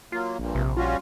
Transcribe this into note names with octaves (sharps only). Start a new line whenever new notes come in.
F#3 A#3 F4
A#1 G2 A#2
A#1 C3
G3 C#4 F4 F#4